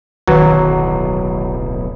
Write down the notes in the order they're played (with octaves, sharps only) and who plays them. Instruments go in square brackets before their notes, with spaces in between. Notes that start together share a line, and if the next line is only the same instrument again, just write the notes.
[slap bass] D1 B1 [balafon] D#3 F#4 B4 [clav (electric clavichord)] F#3